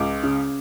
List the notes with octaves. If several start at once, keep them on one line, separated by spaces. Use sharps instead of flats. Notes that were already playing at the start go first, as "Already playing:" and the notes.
Already playing: C#2 D6
C#3